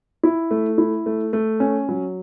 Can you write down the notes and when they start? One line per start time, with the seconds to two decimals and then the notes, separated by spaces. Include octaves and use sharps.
0.23 E4
0.51 A3
0.78 E4
1.06 A3
1.33 A3
1.60 C#4
1.89 F#3